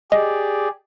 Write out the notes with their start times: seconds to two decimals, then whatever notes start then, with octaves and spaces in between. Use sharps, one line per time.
0.12 G4 G#4 D5 D#5